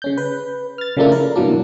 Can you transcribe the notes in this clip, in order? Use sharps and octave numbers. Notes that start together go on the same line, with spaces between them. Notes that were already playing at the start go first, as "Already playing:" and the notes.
C#3 C#4 G6
B4
F6 A6
C#3 F3 A3 A#3 D4 E4
A#4
G2 B2 E3 F#3 A#3 D4